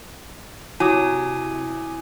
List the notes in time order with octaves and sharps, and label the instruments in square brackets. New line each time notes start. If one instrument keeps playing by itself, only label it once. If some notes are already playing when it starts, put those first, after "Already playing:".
[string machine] C3 [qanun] F#3 [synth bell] E4 [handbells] G#5 D6 D#6